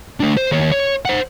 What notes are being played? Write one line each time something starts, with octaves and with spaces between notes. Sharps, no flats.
A3 D4
C5
D#2 C#5
C#5
C5 F#5